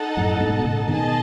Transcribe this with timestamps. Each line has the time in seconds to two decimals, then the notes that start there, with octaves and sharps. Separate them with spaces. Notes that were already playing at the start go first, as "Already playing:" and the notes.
Already playing: D#4 A4 D#5 F#5 A5
0.17 F#2 A2
0.40 G#2 B2
0.65 A2 C#3
0.88 B2 D#3 G#4 D#5 A5